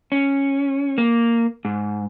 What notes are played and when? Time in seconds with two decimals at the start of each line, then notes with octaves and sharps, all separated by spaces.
0.12 C#4
0.98 A#3
1.65 G#2